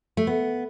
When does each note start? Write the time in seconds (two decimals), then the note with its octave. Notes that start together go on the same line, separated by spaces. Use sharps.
0.17 A3
0.27 B3